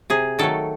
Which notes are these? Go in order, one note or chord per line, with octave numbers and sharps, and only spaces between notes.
C3 G#4
D#3 F#3 A3 A4